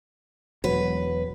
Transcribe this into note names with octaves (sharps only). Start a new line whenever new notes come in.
E1 F#3 B4